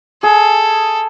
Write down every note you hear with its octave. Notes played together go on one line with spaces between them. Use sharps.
G#4 A4